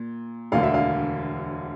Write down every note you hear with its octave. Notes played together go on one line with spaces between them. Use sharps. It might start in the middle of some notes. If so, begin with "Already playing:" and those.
Already playing: A#2
E1 D2 D3 F5
E5
F5